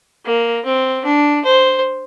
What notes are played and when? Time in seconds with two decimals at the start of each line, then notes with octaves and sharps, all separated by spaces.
0.25 A#3
0.65 C4
1.04 D4
1.44 C5